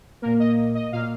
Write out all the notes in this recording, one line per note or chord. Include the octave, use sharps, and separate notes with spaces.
A#2 A#3 A#4
D#5
D#5
A#2 A#3 F5